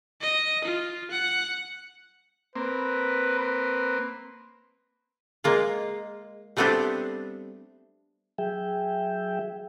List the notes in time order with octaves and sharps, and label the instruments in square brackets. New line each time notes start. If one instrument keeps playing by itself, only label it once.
[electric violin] D#5
F4
F#5
[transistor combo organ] A#3 C4 [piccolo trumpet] B4
[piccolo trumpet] B4
[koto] G#3 A#3 F4
G3 A3 B3 C4 D4 G4
[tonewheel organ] F#3 G#4 E5 G5